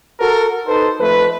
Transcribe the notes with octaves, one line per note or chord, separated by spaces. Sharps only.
F#4 A4 A#4
D#4 A4 B4 C5
F2 A3 B4